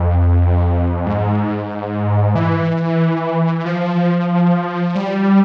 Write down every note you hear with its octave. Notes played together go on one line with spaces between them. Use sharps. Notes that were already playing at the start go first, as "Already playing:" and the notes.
Already playing: F2
G#2
E3
F3
G3